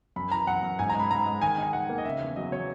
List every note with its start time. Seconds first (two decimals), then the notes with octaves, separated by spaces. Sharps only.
0.16 F#2 B5
0.31 E3 A#5
0.47 F#2 F#5
0.63 F#2
0.79 G#2 G#5
0.89 A#5
0.94 G#3
1.00 B5
1.11 G#2 A#5
1.26 G#3
1.41 D#3 G#5
1.58 D#4 G#5
1.73 D#3 F#5
1.89 A#3
1.98 D#5
2.05 C#3 E5
2.21 E2
2.36 F#3 D#5
2.52 F#3 C#5